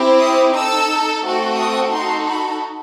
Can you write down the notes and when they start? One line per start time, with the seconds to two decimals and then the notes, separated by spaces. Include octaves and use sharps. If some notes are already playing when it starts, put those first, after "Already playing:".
Already playing: C4 E4 G4
0.20 D#6
0.54 D#4 A4 E6
1.24 A3 C4 F#4 A4
1.58 D#6
1.93 D#4 F#4 A4 C6
2.28 B5